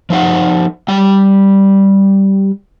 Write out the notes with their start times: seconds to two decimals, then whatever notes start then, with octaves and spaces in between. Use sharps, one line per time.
0.10 F3 D#4 C5 F#5
0.88 G3 G5